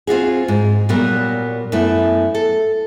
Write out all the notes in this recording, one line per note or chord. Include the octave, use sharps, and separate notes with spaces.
C4 F4 F#4 G#4
G#2
A#2 F#3 G3 B3 F#4 A#4
F#2 A3 B3 E4
A4